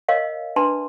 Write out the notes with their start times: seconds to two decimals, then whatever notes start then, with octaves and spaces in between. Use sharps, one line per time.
0.09 A#4 C#5 D#5 F5
0.56 D4 B4 A5 C6